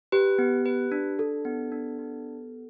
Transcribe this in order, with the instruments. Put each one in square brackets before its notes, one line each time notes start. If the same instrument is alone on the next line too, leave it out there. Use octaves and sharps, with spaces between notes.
[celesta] G4 [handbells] B4
[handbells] B3
B4
D4
[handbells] D4 [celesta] A4
[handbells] B3
D4
B3